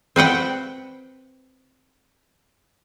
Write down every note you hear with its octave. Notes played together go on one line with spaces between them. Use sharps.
C4 B4 F#5 G5